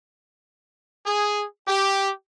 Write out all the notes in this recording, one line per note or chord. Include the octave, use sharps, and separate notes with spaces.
G#4
G4